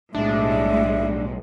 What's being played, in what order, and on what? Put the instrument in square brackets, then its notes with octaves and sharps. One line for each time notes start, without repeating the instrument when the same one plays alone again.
[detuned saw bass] B1 [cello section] A2 G3 G#3 [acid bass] D4 [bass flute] E5